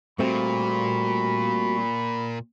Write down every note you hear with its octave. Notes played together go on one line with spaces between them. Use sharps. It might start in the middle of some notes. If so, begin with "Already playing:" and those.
A#2 G3 A3 C4 F#4 B5